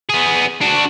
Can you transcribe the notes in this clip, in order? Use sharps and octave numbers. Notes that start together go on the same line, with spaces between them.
B3 G#4
D4 F#4